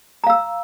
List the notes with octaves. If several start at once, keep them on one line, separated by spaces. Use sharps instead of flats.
F5 A#5 E6